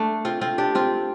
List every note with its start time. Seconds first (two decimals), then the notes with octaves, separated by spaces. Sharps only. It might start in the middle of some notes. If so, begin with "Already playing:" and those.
Already playing: A3 D4
0.25 C4 F4
0.41 C4 F4
0.58 D4 G4
0.75 C4 F4